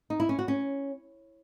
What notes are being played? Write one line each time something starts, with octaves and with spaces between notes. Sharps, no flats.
D#4
E4
C#4
F#4
C#4